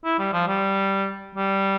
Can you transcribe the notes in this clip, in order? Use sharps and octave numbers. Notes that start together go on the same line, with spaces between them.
E4
G3
F3
G3
G3